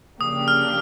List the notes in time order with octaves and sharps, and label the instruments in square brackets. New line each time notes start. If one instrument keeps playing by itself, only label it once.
[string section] C#3 F3 A#3 D4 G4 [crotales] D#6
[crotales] F6